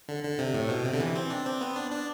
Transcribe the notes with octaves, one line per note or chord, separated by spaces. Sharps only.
D3
D3
C3
A2
B2
C3
D3
E3
C4
D4
C4
B3
D4
D4